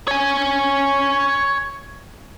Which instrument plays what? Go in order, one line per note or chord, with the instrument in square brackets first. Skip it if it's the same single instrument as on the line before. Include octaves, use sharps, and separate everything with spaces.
[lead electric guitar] C#5 G#5